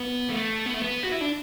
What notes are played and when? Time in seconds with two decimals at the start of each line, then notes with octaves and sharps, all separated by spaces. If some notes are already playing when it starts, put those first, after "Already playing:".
Already playing: B3
0.29 A3
0.66 B3
0.74 A3
0.82 B3
1.04 F#4
1.12 E4
1.22 D4